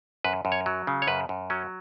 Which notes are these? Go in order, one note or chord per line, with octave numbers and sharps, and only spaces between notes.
F#2 B4
F#2
C#5
F#3
C#3
C#5
F#2 B4
F#2
F#3 C#4